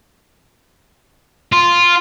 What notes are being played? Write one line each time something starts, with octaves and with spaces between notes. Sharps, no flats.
F4